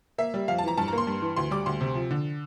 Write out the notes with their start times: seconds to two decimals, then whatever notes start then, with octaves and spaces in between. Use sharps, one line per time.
0.18 A#3 E5
0.34 G3
0.48 F2 F5
0.58 A5
0.64 E3 A#5
0.78 G2 A5
0.88 A#3 A#5
0.98 C6
1.07 G2
1.22 E3
1.36 D2 C6
1.51 G3 D6
1.66 D2 C6
1.81 C3
1.95 F3
2.11 D3